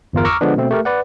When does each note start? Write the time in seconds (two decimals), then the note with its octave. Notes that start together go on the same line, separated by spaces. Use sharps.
0.13 G1 E2 F4 A#4
0.25 A#5 C#6 D6 E6 F6
0.41 D3 F3 G#3 B3 D4
0.57 B2 A3 C4
0.71 A3 G4 A#4
0.85 B4 D5 F#5